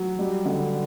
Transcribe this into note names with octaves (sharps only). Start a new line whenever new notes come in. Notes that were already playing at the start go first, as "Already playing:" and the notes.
Already playing: F#3
G3
D3